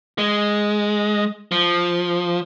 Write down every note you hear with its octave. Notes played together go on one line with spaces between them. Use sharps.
G#3
F3